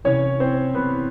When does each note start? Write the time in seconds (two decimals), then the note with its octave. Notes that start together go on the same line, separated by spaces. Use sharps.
0.04 C2 C3 E3 C#4 C#5
0.40 C4 C5
0.74 C2 C3 E3 B3 B4